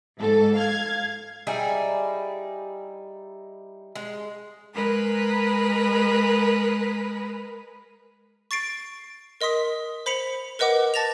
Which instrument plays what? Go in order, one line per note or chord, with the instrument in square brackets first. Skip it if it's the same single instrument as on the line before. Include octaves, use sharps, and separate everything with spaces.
[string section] G#2 A4
F5 G#6
[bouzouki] G3 D#4 E4 G#4
G#3
[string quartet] G#3 A#4 B4
[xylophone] C#6 A6 C7 D7
A#4 D#5 C6 D#6 B6
C5 B5 B6 C#7 F7
A#4 B4 D#5 F#5 D6
A5 A6 A#6 E7 F7